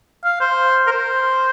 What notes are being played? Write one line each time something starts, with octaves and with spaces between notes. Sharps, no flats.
F5
C5
A#4
C5